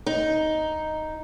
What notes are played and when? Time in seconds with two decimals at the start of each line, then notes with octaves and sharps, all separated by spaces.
0.06 D#4